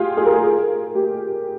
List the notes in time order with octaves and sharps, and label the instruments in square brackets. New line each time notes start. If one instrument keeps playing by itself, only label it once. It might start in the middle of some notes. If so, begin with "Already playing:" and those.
Already playing: [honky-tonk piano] F4 G4 G#4
G#4
A#4
G#4
G4